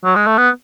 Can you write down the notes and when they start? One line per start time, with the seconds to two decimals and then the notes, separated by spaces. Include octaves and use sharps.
0.04 F#3
0.16 G#3
0.26 A3
0.38 B3